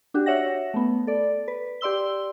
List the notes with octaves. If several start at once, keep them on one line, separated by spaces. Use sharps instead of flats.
D4 F#4 G4
C#5 E5 F#5 A#6
A3 B3
A4 D5
B4
G4 D5 C6 E6 G7